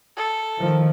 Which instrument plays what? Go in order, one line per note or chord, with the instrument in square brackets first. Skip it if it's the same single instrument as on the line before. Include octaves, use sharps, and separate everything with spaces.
[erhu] A4
[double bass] D#3 F3